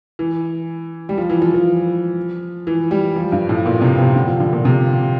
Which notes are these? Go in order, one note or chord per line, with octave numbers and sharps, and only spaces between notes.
E3
G3
F3
E3
F3
F3
E3
G3
F3
G2
A2
A#2
C3
C3
D3
F3
D3
A#2
C3